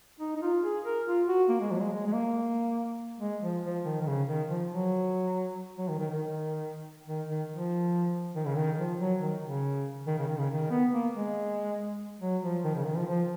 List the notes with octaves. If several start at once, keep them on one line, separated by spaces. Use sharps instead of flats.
D#4
D#4
F4
G#4
A#4
F4
F#4
A#3
G#3
F3
F#3
G#3
G#3
G#3
A#3
G#3
F3
F3
D#3
D#3
C#3
D#3
F3
F#3
F#3
D#3
D#3
D#3
D#3
D#3
F3
D#3
C#3
D#3
F3
F#3
D#3
C#3
D#3
C#3
D#3
C#3
D#3
B3
A#3
G#3
F#3
F3
D#3
C#3
D#3
F3
F3